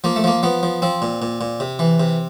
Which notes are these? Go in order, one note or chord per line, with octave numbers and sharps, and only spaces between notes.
F3 A#3
A3
F3 A#3
F3 B3
F3
F3 C4
A#2
A#2
A#2
C3
E3
C3